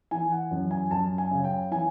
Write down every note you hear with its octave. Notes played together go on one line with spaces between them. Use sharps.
E3 G#5
F#5
F#2
G#5
F#2 A5
G#5
C#3
G5
E3 G#5